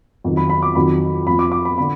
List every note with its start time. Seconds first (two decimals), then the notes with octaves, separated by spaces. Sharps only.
0.24 F2 D#3 F#3
0.37 B5
0.50 B5
0.63 D6
0.75 F2 D#3 F#3 B5
1.27 F2 F3 B5
1.39 D6
1.52 D6
1.65 B5
1.78 D3 B5